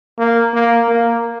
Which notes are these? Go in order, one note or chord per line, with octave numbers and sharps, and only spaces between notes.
A#3
A#3
A#3